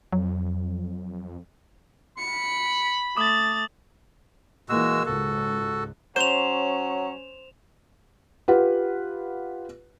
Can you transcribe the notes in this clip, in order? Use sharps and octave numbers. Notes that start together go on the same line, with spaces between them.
F2 F#3
B5 C#7
A3 D6 D#6 A6 F#7
A#2 E3 G#3 A#3 F#4 E6
C#2 G#2 F#4 A4
F#3 C#4 C5 G6 E7 F7
F4 G4 B4 F#5